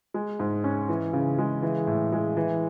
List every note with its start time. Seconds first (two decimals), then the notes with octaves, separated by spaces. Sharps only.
0.14 G#3
0.40 G#2
0.64 C#4
0.89 E3
1.13 C#3
1.38 G#3
1.62 E3
1.87 A2
2.12 G#3
2.37 E3